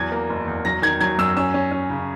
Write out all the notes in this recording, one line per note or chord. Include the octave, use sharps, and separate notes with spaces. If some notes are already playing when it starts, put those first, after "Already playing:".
Already playing: E2 F#3 G#6
A#3
F#1
E2
F#3 A#6
D#3 G#6
F#3 G#6
F#2 E6
C#4 E6
C#4
C#4
C#3